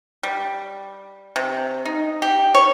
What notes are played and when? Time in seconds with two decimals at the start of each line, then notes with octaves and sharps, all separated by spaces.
0.23 G3
1.36 C3
1.85 D#4
2.22 G4
2.55 C#5